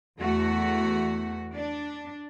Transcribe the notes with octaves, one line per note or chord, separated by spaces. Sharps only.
E2 A3 F#4
D4